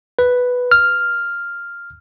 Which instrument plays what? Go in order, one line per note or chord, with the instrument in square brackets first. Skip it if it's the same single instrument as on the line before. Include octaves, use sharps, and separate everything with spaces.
[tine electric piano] B4
F6